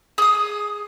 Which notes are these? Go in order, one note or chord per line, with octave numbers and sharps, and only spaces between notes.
G#4 D#6